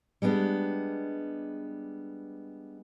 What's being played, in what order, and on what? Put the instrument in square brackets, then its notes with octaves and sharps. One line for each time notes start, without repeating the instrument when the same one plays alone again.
[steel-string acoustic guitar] G3 G#3 B3 D4